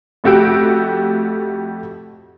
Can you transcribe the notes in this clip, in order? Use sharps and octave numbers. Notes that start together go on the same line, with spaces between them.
F2 A3 F#4 G4 E6 D7